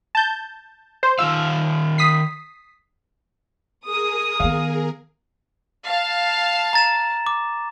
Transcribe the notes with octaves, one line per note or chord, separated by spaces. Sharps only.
A5 G6
C5
D#3 F4 F5 E6
D#6 B6 C7
G#4 A#4 D#6
D#3 B3 F5
F5 A5
A#5 A6 E7
D6